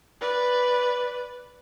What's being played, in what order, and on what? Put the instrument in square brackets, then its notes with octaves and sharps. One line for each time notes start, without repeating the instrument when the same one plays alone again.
[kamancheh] B4 D5